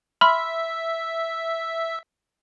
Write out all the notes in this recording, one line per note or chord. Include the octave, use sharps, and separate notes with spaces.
E5 B5 C6 F6